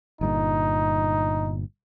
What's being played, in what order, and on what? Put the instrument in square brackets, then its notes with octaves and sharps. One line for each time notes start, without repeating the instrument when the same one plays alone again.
[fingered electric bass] G1 G2 A#2 [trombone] D#4